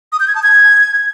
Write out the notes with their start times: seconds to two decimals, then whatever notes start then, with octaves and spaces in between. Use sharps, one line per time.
0.12 D#6
0.20 G6
0.28 G#6
0.35 A5
0.43 G#6